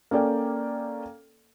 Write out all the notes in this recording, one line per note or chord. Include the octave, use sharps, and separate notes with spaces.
A#3 C#4 A4 D5 G5